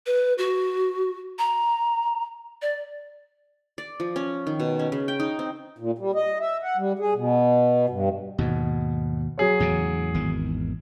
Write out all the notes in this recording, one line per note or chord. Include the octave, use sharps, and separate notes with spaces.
B4
F#4
A#5
D5
D5
F3
C#4
D#3
B2
C#4
C#3
G5
D#4
C4
A#2
G3
D#5
E5
F#5
G3
G#4
B2
G2
D#2 G#2 B2
F#3 G#4 C#5
E2 A2 C#3
G#1 E2 D#3